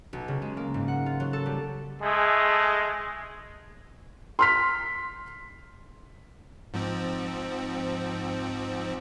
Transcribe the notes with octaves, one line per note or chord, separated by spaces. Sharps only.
B1
C#3
G#3
A#3
G#2
F#5
F4
F#3
A4
G3
G#3 A3 G#4
C6 F6 B6
G#2 F3 C4